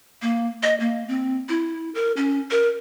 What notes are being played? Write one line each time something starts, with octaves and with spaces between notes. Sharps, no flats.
A#3
D#5
A#3
C4
E4
A#4
C#4
A#4